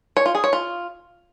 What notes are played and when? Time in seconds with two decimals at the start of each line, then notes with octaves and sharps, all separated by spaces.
0.17 C#5
0.26 F4
0.35 G#4
0.44 C#5
0.53 F4